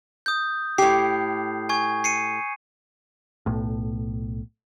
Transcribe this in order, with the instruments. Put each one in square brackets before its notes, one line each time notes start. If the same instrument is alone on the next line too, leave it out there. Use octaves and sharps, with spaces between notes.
[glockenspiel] D#6 G6
[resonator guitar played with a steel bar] A2 G4 [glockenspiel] C7
[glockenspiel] G#5 C#6 G#6
C7 C#7 D#7
[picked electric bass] B1 A2